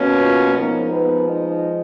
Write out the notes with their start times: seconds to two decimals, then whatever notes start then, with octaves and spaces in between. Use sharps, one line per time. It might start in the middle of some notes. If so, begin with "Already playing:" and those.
Already playing: B2 A#3 C#4
0.17 F4
0.54 F3 G#3 A#3 B3 D#4 A#4
0.92 B3 B4
1.29 D#4 D#5